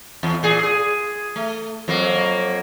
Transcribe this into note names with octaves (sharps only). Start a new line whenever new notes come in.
E2
A#2 G#4
G#4
A3
F2 F#3 A#3